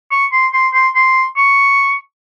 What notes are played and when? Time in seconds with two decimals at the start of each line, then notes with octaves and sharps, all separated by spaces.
0.11 C#6
0.32 C6
0.53 C6
0.74 C6
0.95 C6
1.37 C#6